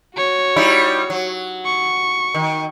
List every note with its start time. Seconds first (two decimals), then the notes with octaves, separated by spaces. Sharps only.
0.15 F#4 C#5
0.56 G3 D#4 E4
1.10 F#3
1.65 C#6
2.34 D#3